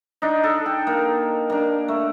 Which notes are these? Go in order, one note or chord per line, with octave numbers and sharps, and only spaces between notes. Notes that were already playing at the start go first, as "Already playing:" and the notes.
D4 D#4
A4
G5
A#3
A#3 D4
A3